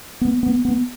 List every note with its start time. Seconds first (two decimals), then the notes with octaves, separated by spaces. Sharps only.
0.21 B3
0.43 B3
0.65 B3